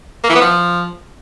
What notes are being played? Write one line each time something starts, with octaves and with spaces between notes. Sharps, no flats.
A#3
E3
B3
F3